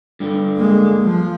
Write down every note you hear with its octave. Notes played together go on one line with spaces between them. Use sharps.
G2 D3
G#3 A#3
F3